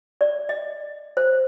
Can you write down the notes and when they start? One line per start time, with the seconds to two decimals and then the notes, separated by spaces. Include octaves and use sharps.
0.21 D5
0.49 D#5
1.17 C5